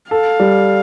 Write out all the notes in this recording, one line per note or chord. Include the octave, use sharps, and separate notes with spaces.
A4 F5
G3